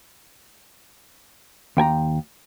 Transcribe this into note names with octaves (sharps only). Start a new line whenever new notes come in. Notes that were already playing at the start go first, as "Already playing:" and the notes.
D#2 G5 G#5 A#5